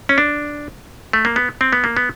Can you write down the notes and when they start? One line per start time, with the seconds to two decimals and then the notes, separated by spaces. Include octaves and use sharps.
0.09 C#4
0.18 D4
1.13 A3
1.25 A#3
1.36 B3
1.61 C4
1.73 B3
1.84 A#3
1.97 B3